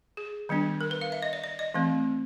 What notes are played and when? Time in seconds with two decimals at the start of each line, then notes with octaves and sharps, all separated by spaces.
0.17 G#4
0.49 D#3 G3 B3 D4
0.81 A#4
0.91 B4
1.01 F5
1.12 E5
1.22 D#5
1.33 D5
1.44 D5
1.59 D#5
1.74 E3 A3 C4